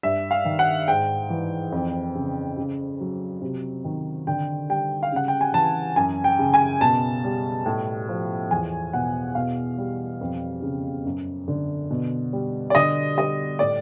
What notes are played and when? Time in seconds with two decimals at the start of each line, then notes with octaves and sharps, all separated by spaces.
0.03 G2 E5
0.31 F5
0.45 D#3
0.59 F#5
0.88 G#2 G5
1.30 E3
1.72 F2
2.15 C#3
2.58 C#3
3.00 F#3
3.42 C3
3.84 D#3
4.27 D3 G5
4.69 G3 G5
5.03 F5
5.12 C#3 F#5
5.28 G5
5.41 G#5
5.54 E3 A5
5.96 F#2 G#5
6.24 G5
6.39 C#3
6.54 G#5
6.81 B2 A5
7.24 G3
7.66 A2
8.09 F3
8.51 E2 G#5
8.93 B2 F#5
9.35 B2 F5
9.78 G3
10.21 F2
10.62 C#3
11.05 F#2
11.48 D3
11.91 B2
12.33 G3
12.70 D5
12.75 D3 D#5
13.17 G3 D#5
13.59 A2 D5